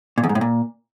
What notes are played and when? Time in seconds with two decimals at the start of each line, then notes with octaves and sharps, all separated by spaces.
0.18 A#2
0.23 E2
0.29 G#2
0.35 A2
0.41 A#2